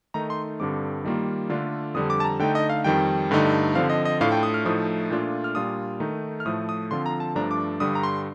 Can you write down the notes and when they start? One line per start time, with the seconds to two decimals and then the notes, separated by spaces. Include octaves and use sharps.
0.14 D#3 A3 D#4 A#5
0.30 C6
0.60 G2 D3 G3 C4 D6
1.05 D#3 G3 A#3 F4
1.50 D3 A3 D4 F4
1.94 F2 D3 G3 D#6
2.10 D6
2.20 A5
2.24 A#5
2.39 D3 A3 D#4 G5
2.55 D#5
2.70 F5
2.84 F2 D#3 G3 G5
3.31 G2 D3 A3 D#4
3.75 D3 F3 C4 F5
3.90 D#5
4.05 D#5
4.20 A2 A3 D4 F4 F5
4.32 G5
4.43 D#6
4.54 F6
4.65 A2 F3 A3 D#4 D#6
5.11 A#2 A3 D4 F4
5.44 F6
5.55 A#2 G3 D4 F4 D#6
6.00 D#3 A3 D#4
6.40 F6
6.46 A2 F3 A3 D#6
6.69 D#6
6.91 D3 F3 C4 F4 C6
7.06 A#5
7.20 A5
7.35 G2 F3 A3 D4 A#5
7.51 D6
7.80 G2 D3 G3 D#6
7.95 A#5
8.03 C6